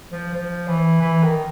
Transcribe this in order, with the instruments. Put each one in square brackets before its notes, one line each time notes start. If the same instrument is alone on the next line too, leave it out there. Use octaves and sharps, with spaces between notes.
[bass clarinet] F3
F3
E3
E3
D#3